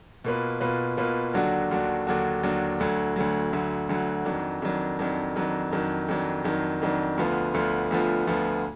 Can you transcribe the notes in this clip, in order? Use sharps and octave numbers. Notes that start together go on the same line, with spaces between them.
B2 A#3 F4 B4
B2 A#3 F4 B4
B2 A#3 F4 B4
D#2 D3 F#3 D4 F#4
D#2 D3 F#3 D4 F#4
D#2 D3 F#3 D4 F#4
D#2 D3 F#3 D4 F#4
D2 D3 F#3
D2 D3 F#3
D2 D3 F#3
D2 D3 F#3
F2 D#3 F#3 D4
F2 D#3 F#3 D4
F2 D#3 F#3 D4
F2 D#3 F#3 D4
F2 D#3 F#3 D4
F2 D#3 F#3 D4
F2 D#3 F#3 D4
F2 D#3 F#3 D4
D2 D3 F3 B3 F4
D2 D3 F3 B3 F4
D2 D3 F3 B3 F4
D2 D3 F3 B3 F4